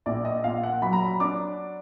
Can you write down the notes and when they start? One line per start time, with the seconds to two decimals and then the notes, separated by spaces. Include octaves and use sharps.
0.06 A#1 D5
0.25 D#5
0.44 A#2 F5
0.63 F#5
0.82 F#3 B5
0.93 A#5
1.05 B5
1.20 D4 D6